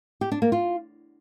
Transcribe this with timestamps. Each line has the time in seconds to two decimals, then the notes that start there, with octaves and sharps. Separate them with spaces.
0.21 G4
0.32 D4
0.42 A#3
0.52 F4